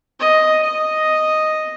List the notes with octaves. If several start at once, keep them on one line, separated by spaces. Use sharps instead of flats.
D#5
D#5